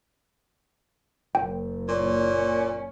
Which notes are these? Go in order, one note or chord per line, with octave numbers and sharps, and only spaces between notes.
F#1 G5
A#2 C#4